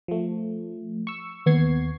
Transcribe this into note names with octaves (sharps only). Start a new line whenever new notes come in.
F3 A3
C#6 E6
D#2 B3 C#6 G#6 C7